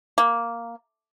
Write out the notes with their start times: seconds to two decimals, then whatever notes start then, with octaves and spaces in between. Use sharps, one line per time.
0.18 A#3